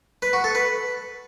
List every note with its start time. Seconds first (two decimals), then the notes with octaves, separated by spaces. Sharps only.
0.22 B4
0.33 F#4
0.44 A4
0.55 B4